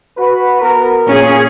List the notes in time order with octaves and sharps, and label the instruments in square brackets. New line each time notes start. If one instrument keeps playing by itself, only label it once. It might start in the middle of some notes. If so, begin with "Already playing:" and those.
[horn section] F#4 B4
B3 F#4 A#4
[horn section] A#2 [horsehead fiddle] C#4 G#4